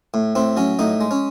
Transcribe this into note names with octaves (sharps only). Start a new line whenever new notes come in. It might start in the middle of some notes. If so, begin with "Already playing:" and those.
A2
A2 C4
F#3 C#4
A2 D#4
G#3
C#4